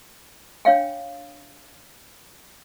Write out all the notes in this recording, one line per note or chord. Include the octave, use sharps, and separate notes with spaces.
D4 C#5 F5 G5